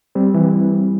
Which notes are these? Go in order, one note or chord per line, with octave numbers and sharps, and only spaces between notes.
G3 C4
E3